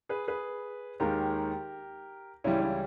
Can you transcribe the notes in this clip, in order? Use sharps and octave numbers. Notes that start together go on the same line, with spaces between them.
G#4 B4
G#4 B4
D#2 D#3 G#3 G4 A#4
C#2 C#3 E3 G3 C#4 E4
C#4 E4